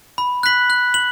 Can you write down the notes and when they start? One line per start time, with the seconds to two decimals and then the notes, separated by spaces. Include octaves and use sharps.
0.18 B5
0.43 F#6 B6 F#7
0.70 F#6
0.94 F#7